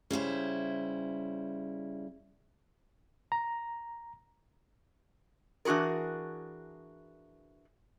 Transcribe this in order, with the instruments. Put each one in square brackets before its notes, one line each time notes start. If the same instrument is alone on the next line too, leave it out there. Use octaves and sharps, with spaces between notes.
[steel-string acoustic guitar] C#3 G3 E4 C5
[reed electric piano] A#5
[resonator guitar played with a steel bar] E3 D4 F#4 G#4 A#4